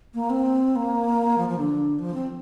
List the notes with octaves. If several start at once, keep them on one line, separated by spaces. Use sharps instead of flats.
A#3
C4
A#3
F3
F3
D3
F3
C4